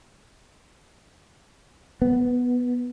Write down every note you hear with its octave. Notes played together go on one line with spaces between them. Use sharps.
B3